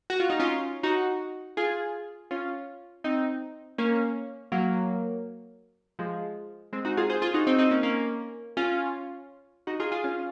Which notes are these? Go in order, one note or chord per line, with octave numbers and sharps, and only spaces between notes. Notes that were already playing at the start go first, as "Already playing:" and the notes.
F#4
F4
D#4
C#4 F4
D#4 F#4
F4 G#4
C#4 F4
C4 D#4
A#3 C#4
F#3 A#3
F3 G#3
G#3 C4
D#4 F#4
F4 G#4
G#4 C5
F4 G#4
D#4 F#4
C4 D#4
C4 D#4
A#3 C#4
A#3 C#4
C#4 F4
D#4 F#4
F4 G#4
F4 G#4
C#4 F4